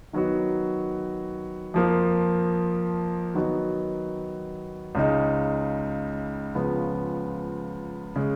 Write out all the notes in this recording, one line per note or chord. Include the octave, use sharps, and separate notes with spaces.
D#3 F#3 B3 D#4 F#4
F2 F3 A#3
D#3 F#3 B3 D#4 F#4
C#2 C#3 G#3 D#4
C#2 C#3 F3 B3
C#3 G#3